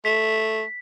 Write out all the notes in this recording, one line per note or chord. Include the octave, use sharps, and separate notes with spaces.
A3 B6